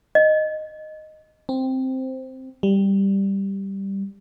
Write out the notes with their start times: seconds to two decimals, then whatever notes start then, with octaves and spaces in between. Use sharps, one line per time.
0.15 D#5
1.49 C4
2.63 G3